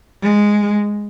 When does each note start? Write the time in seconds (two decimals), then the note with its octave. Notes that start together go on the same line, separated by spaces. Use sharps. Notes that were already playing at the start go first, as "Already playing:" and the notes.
0.22 G#3